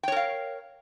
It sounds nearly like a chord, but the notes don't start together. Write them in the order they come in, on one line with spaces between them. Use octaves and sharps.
G5 C#5 A#4 F5